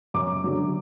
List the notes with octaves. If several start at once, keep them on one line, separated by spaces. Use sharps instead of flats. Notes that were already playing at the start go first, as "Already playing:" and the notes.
F#2 D6
D3 F#3